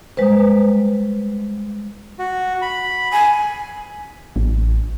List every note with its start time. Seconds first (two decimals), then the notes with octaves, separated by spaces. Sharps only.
0.17 G3 G#3 B4 C5
2.19 F#4
2.62 B5
3.13 G#5
4.36 A1